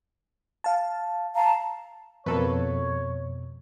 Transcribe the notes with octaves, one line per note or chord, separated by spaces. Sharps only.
F5 A5
F5 A5 A#5
F2 B2 A#3 A4 B4 C#5